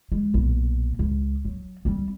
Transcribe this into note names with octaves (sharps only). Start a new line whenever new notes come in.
G#3
B1 A#2
C#2
F#3
G3 C4